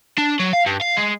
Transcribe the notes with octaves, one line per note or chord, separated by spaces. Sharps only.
D4
F#3
F5
G2
F5
G#3